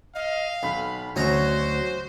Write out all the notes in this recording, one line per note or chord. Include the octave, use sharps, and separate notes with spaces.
D#5 F5
B1 B5
D2 F#3 C#4 F#4 C5 D#5 A#5